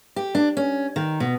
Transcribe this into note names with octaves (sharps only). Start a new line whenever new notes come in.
G4
D4
C#4
D#3
B2